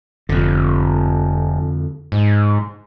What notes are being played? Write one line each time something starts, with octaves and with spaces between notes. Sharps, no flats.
F1 F2 D3
G#2